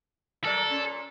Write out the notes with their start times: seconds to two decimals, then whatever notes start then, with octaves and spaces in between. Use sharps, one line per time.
0.45 F#3 A4 A#4 D5
0.65 A#2 C#4